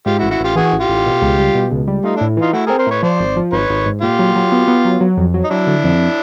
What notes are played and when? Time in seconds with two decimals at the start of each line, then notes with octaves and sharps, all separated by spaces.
0.06 G#2 F4 G4
0.19 E4 F#4
0.22 A1
0.31 E4 F#4
0.39 A1 F4 G4
0.56 E3 F#4 G#4
0.73 A1
0.80 F4 G4
0.89 A1
1.06 B2
1.22 C#2
1.39 G3
1.55 B2
1.72 C#2
1.88 G3
2.04 A3 D#4 F4
2.16 D4 E4
2.21 A2
2.37 E3 D#4 F4
2.53 A3 E4 F#4
2.66 G#4 A#4
2.70 C4
2.78 A#4 C5
2.87 A2 B4 C#5
3.03 F3 C5 D5
3.19 G#1
3.37 F3
3.52 G#1 B4 C#5
3.69 G#1
3.86 G#2
4.02 A#2 F4 G4
4.19 F#3
4.36 F#3
4.52 B3
4.68 B3
4.85 F#3
5.01 F#3
5.17 F2
5.34 F#3
5.44 D#4
5.50 F#3 D4 E4
5.67 D3
5.84 F2